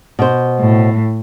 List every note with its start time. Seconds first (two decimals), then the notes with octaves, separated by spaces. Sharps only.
0.19 B2 C5
0.59 A2